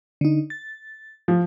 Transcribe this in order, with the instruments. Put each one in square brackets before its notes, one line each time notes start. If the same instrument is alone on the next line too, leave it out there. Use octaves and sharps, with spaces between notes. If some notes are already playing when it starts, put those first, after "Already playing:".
[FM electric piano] D3 D#4
A6
[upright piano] F3